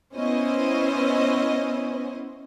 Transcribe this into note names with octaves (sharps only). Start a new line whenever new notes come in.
B3 C#4 E4 C5 D#5